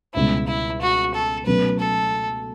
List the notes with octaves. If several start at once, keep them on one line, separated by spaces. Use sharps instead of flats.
C#2 B2 G3 C#4 E4
E4
F#4
A4
B2 F#3 A3 C#4 B4
A4